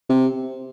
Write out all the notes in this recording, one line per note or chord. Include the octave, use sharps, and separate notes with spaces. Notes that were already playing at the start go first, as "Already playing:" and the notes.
C3